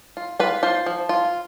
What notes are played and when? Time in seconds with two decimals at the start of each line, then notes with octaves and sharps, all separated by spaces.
0.17 F4
0.39 F4 B4
0.63 F4 C5
0.86 F3
1.09 F4